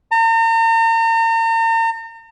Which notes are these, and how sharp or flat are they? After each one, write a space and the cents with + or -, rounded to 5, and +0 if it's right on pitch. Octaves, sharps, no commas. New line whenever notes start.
A#5 -40